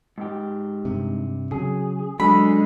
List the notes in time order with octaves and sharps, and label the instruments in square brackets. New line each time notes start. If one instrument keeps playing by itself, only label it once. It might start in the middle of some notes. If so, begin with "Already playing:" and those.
[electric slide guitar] G#2 G4
[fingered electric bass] G2 C3
[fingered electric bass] C#3 F#3 [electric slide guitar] G#4
[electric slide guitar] D3 [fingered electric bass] F#3 [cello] G#3 [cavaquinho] B5